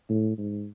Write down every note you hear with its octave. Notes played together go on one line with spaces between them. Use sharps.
A2
G#2